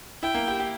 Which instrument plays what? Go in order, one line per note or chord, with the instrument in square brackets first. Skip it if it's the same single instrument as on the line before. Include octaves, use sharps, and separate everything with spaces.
[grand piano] E4 [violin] G5
[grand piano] A#3
G4
G4